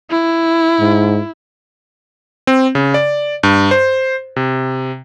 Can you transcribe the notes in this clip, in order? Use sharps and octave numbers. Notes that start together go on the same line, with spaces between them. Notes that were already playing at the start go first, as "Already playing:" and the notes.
E4
G#2
C4
C#3
D5
G2
C5
C3